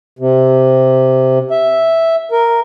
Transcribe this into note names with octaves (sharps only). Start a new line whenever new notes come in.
C3
E5
A#4